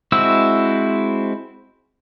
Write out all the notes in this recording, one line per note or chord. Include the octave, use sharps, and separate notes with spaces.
G#3 C4 E4 F#4 E6